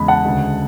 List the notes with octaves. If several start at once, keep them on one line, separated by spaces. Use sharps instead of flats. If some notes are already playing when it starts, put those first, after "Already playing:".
Already playing: E2 C#3 G#3 B5
F#5 A5
D2 C#3 G#3